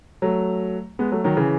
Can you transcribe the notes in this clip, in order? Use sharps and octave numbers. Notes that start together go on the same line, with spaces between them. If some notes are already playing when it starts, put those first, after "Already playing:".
F#3 A3
G#3 B3
F#3 A3
D#3 F#3
C#3 E3